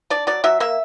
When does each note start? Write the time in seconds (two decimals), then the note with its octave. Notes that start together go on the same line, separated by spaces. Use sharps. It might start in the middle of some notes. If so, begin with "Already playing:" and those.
0.10 D4 D5
0.27 F#3 D5
0.44 F#3 E5
0.60 A#3 E5